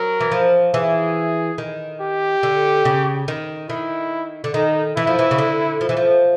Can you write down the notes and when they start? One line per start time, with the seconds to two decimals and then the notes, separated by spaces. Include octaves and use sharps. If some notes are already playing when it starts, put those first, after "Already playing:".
Already playing: F#3 A#4
0.20 E3
0.31 F3
0.74 E3 G#4
1.58 D#3
2.01 G4
2.43 D3
2.85 C#3
3.28 D#3
3.69 D#3 E4
4.44 D3
4.54 D#3 D#4
4.96 E3 E4
5.07 F3
5.19 E3
5.31 C#3
5.38 D3
5.81 F3
5.89 E3
5.97 F3